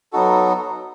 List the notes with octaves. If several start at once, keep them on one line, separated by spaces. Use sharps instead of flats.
F#3 B3 D#4 F#4 A4